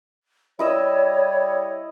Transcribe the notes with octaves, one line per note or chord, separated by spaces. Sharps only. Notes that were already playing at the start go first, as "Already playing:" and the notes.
G3 E4 C#5 D#5 E6